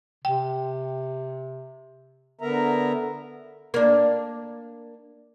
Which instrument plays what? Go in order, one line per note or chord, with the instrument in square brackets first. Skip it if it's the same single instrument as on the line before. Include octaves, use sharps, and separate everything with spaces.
[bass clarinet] C3 [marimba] G5
[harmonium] D3 B3 A#4 E5 A#5
[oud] A#3 D4